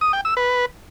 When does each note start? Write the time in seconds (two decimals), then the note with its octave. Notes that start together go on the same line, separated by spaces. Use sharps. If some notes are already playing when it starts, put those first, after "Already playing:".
0.01 D#6
0.13 G5
0.25 E6
0.37 B4